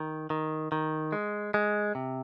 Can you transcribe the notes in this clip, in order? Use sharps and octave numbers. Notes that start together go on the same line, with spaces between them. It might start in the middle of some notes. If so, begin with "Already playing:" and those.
Already playing: D#3
D#3
D#3
G#3
G#3
C3